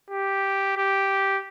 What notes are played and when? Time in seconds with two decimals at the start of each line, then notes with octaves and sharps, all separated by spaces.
0.11 G4
0.77 G4